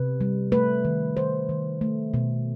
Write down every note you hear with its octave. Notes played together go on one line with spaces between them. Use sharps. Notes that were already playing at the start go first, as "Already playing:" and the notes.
Already playing: C3 B4
G3
A3 B4
D#3
D#3 C5
D#3
A3
B2